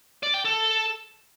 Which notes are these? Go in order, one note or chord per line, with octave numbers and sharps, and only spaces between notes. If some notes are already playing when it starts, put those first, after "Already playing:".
D5
G5
A4